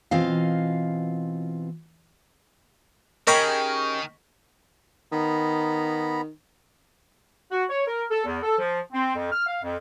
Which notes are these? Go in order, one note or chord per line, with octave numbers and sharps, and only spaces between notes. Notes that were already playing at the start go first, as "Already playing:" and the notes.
B2 E3 C4 F4 D#5 F5
D#3 C#4 G4 G#4 A#4 D#5 B5 C#6
D#3 B3 A#5 B5
F#4
C#5
A#4
A4
E2
A4
F3
C4
F2
F6
F5
F2